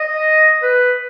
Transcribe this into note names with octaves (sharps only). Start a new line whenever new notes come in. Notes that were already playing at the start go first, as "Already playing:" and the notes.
Already playing: D#5
B4